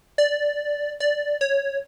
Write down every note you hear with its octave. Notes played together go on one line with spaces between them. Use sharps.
D5
D5
C#5